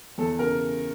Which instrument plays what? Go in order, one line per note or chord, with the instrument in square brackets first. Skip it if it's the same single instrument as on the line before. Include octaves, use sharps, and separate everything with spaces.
[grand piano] E2 [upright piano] A4
[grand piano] C#3 [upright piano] A#4